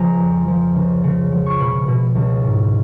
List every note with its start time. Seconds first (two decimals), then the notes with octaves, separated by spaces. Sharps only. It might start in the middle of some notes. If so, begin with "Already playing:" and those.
Already playing: C#2 C#3 F3 G#5 A#5
0.20 F2
0.48 F3
0.76 C#2
1.04 C#3
1.32 F3
1.46 C#6
1.59 B2 B5
1.88 B2
2.15 C#2
2.44 G#2